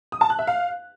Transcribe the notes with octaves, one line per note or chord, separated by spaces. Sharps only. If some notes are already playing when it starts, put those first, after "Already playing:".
D#6
A5
F#6
E5
F5